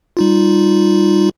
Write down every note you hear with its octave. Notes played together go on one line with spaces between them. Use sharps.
G3 D#4 F4